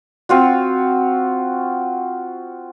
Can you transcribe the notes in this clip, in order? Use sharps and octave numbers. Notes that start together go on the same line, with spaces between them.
C4 F4 F#4